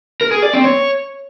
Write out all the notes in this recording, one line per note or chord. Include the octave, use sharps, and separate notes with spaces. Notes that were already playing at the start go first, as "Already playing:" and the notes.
A#4
G#4
D5
C4
C#5